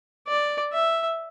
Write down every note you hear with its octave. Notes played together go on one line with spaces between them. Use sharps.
D5
E5